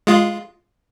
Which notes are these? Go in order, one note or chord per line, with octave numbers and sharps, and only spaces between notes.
G#3 F4